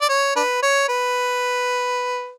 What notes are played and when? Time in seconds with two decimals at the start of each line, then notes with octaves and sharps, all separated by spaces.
0.02 D5
0.09 C#5
0.36 D4 B4
0.63 C#5
0.89 B4